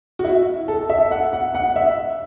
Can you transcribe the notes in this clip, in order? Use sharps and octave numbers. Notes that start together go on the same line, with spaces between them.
F#4
E4
A4
E5
F#5
F#5
F#5
E5